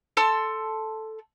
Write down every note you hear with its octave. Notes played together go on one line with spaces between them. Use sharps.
A4 A5 C6 E6